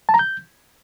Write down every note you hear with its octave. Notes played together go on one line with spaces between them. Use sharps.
A5
A#5
G6